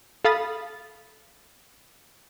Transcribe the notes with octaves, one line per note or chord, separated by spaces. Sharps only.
A4 F5 B5 D#6 A6